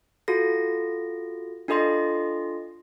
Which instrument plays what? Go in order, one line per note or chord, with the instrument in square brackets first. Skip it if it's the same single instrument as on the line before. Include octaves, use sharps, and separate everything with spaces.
[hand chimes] F4 F#4 A4 A#6
D4 F4 A4 D#5 C6 A#6